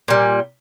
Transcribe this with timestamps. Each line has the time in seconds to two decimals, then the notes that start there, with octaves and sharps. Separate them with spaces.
0.08 A#2 G3